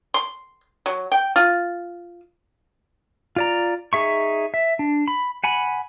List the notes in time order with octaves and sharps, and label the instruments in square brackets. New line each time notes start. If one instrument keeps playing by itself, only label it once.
[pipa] C6
F#3
G5
F4
[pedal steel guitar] F4 D5 A#5
D#4 G#4 E5 C#6
E5
D4
B5
F#5 G#5 B5